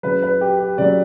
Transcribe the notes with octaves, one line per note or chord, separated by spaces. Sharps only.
C#3 F#3 B4
B4
G4
G4
C#3 F#3 D5